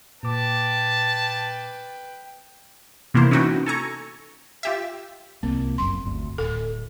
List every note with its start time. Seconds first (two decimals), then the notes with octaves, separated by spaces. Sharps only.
0.23 A#2 B4 G5 A5 D6
3.14 C3 E3 A#3 B3 E4 C5
3.31 C#4 D#4 E4 F#4 B4 G5
3.66 A4 G#5 A#5 C#6
4.63 F4 G4 E5
5.43 C2 A#3 C4
5.78 G1 F#2 C6
6.06 G1 D2
6.38 D1 A4